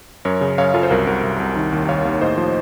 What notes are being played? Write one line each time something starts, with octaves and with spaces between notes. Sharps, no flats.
F#2 A#4 C#5
C#3
F#2 C#5 F5
F#2 F4 A4
C5
C2 F#4 A#4
C2 F#4 A#4
C2
C2
D#3
D#2
D#2 C#5 F5
D#2
A2 C5 D#5
F3